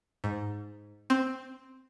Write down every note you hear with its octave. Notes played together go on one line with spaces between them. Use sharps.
G#2
C4